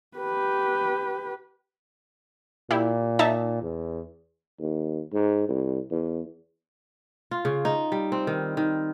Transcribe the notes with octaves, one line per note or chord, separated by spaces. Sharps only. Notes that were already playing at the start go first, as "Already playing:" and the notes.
G4 B4
A#2 E4 G4
D#4 E5 A5
E2
D#2
G#2
C2
E2
F4
C#3
D#4
G3
C4
D#3
D#3